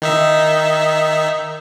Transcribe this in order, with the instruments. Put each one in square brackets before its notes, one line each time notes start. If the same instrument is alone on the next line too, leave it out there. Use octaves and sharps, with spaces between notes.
[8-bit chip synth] D#3 D#4 E5